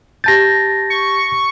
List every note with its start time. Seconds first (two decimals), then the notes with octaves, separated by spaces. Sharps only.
0.24 G4 A5 G6 A6 A#6
0.90 C#6